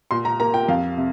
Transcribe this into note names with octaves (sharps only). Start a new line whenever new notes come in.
A#2 C6
A#5
A#3 A#5
G5
F2 F5
C3